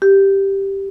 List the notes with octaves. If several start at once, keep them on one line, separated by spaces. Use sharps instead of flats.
G4